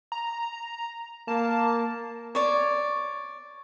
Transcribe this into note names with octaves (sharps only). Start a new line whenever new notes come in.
A#5
A#3 A5
C#5 D5